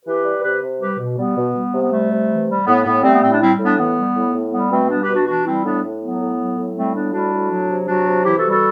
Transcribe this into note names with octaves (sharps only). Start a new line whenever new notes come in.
E3 G4 B4
G3
C3 G4 B4
C3
G3 G4 B4
B2
G3 B3
B2
G3
C3
B3
G3 A3
C3
E3
G3
A2 B3
A2 B3
G3 A3 C4
B3
A2 C4
D4
G3 C4 E4
A2
B3 D4
E3 B3
G3
A2
A2
G3 B3
B2 A3 C4
G3 B3 D4
G4 B4
B2
D4 F#4
E3 D4 F#4
G3 C4 E4
A2 B3 D4
A2
F#3 B3
A2
F#3
A2
G3 A3 C4
A2 B3 D4
G3 D4 F#4
A2
F#3
C3
F#3 D4 F#4
C3
E3 E4 G4
F#4 A4
G3
F#4 A4